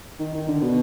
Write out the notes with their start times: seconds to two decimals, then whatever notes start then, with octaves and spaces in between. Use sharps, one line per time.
0.20 D#3
0.34 D#3
0.48 D3
0.62 B2